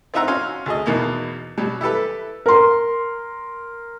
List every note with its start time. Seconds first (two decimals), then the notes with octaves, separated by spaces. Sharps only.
0.14 C4 D#4 F4 E5 F#5 A#5
0.28 C#4 F#4 F5 C6
0.66 D2 G#4 D#5
0.86 E2 B2 A#3 D#4
1.58 B2 F#3 G3
1.81 E4 G4 A4 B4
2.46 A#4 C6